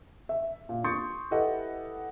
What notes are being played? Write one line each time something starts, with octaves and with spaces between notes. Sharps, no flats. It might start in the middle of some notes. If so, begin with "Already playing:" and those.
E5
A#2
C6 C#6 D#6 G6 A6 C#7
E4 G4 A4 B4 D#5 F#5